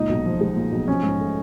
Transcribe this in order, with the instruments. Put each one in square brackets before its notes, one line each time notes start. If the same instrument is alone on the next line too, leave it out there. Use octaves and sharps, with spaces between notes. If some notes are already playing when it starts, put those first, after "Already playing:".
Already playing: [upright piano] C#2 A#2 [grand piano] D#4
[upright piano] B1
F3
G#3
A#2
B1
[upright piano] F3 [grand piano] C#4
[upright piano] G#2
A3